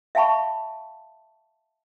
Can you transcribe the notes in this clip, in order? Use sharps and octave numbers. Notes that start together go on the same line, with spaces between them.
E5 F5 G5 A5 B5 C#6